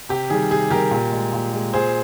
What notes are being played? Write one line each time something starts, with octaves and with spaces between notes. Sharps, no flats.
C3 G4
D#3 G3 G#4
C3 G#4
D#3 G3 G4 A#4
A#2
G#3
A#2
G#3
A#2 G#4 C5